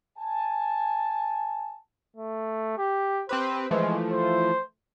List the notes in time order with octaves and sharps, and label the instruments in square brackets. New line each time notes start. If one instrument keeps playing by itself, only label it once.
[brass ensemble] G#5 A5
[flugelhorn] A3
G4
[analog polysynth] C4 G4 B4 [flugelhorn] C5
[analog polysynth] E3 F3 A3 [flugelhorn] G#3
[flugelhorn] C5